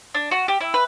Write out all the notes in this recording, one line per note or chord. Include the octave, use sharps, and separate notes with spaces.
D4
F#4
G4
E4
B4